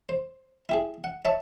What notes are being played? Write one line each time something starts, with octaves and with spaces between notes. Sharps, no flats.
C5
E4 G4 G#4
F#5
D#4 C#5 E5 A5